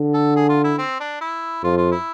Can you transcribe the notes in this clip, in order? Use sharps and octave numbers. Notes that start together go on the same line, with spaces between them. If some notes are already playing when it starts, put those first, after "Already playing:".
Already playing: D3
A4
G#4
F4
E4
C4
D4
E4
F2 F4
F4
E4